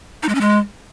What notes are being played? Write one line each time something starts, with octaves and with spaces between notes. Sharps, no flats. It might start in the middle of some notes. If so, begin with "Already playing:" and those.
D#4
G#3
C#4
G#3